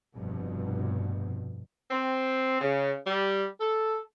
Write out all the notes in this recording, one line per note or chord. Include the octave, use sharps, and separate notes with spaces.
F1 G2 B2
C4
C#3
G3
A4